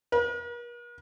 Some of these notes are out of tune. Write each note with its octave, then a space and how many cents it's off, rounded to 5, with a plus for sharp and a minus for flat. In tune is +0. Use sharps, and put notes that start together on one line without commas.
A#4 +45